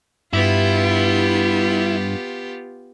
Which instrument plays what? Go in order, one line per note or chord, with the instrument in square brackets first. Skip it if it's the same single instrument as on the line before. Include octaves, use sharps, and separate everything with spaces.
[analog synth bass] G2 [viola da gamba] B3 F4 G4 [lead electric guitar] E4